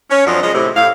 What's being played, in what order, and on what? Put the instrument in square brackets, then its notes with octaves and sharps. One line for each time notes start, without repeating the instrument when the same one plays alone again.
[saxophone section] C#4
F#2 F3 C4 D4 D#5
C#3 F3 G#3 D#5
A2 C3
A2 F5